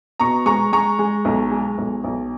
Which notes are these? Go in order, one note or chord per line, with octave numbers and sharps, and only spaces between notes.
B2 A#5 C#6
G#3 A#5 C#6
G#3 A#5 C#6
G#3
B1
G#3
B1
B1